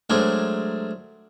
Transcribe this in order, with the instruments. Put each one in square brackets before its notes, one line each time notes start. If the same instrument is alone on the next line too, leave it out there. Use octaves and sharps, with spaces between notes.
[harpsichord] F#3 G#3 A3 D4 A#4 C5